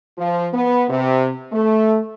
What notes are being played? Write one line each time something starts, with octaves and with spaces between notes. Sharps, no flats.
F3
B3
C3
A3